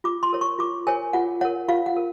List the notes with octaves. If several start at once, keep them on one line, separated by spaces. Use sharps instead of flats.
F4 D6
C6
A#4 C#5
C#6
F4 D6
A#4 C#5 G#5
F4 F#5
A#4 C#5 F#5
F4 F5
F#5
A#4